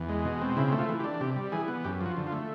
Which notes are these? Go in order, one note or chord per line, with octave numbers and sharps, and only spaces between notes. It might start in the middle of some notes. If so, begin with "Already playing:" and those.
Already playing: E2
G#3
B2
C4
C#3 E4
A3
F4
E3
G4
D4
C3 G4
G3
E3 G#4
B3
F#2 G4
F3 F#4
D3
F4
A3